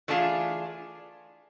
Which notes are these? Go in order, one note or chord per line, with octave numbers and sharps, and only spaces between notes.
E3 A3 D4 F4 G#4